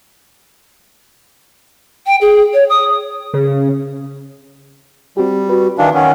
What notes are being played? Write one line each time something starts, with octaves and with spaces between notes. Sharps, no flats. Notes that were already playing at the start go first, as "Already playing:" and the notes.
G5
G#4
C#5
D#6
C#3
G3 C4 F#4 G4
F#4 B4
D#3 E3 D4 F5
D#3 C#4 F#5